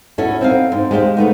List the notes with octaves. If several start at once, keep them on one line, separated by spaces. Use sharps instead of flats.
C#4 E4 F#4 A4
C4 D#4 F5
G#2
G#3 G4 C5 F5
A3 B3 D#4